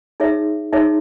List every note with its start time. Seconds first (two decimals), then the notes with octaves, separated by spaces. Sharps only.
0.20 D#4 G#4 C#5 E5
0.73 D#4 G#4 C#5 E5